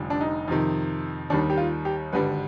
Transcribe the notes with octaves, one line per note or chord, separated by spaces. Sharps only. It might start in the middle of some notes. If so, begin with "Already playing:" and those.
Already playing: F1 F2 D3 G3
D4
D#4
F2 C3 D#3
D#2 D#3 G3 D4
G4
F4
G4
G#1 G2 D3 G3 B4